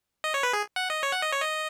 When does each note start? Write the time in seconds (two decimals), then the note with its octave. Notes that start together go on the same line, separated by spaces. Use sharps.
0.24 D#5
0.34 C#5
0.43 B4
0.53 G#4
0.76 F#5
0.90 D#5
1.03 C#5
1.12 F#5
1.22 D#5
1.32 C#5
1.42 D#5